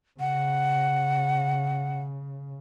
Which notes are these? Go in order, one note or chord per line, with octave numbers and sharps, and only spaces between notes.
C#3 F#5